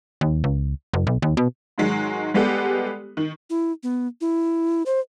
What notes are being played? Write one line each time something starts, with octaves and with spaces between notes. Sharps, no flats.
D#2
C#2
F#1
B1
D#2
B2
G#2 D#3 F#3 G#3
G3 G#3 B3 G4 A4
D#3
E4
B3
E4
C5